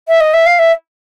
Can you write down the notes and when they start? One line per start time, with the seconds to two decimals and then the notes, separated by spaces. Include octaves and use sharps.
0.08 E5
0.21 D#5
0.34 E5
0.46 F5
0.59 E5